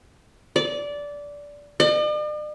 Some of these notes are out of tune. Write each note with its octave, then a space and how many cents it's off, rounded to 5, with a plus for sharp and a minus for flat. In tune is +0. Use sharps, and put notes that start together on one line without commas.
D5 -15
D5 +45